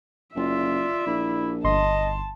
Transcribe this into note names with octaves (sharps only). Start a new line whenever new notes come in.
F#1 F4 D5 E5
A#1 E4
G1 D#5 A5 C6